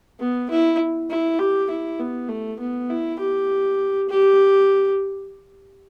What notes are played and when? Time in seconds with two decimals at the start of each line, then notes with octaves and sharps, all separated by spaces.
0.19 B3
0.50 E4
1.10 E4
1.39 G4
1.70 E4
2.00 B3
2.29 A3
2.60 B3
2.89 E4
3.19 G4
4.09 G4